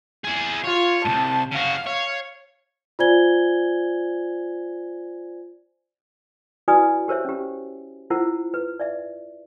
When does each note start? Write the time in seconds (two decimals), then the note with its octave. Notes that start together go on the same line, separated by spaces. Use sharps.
0.25 E4 G#4
0.64 F4 C#5
1.04 C2 G2 A5
1.52 C#3 F#4 F5
1.87 C#5 F5
2.99 F4 C5 D5 G#5 G#6 G7
6.68 E4 F#4 B4 D5 G#5 D#6
7.08 G4 A#4 C5 C#5 E5
7.25 C#4 G4
8.10 E4 F4 A#4 C5 F#5
8.54 B4
8.80 D5 E5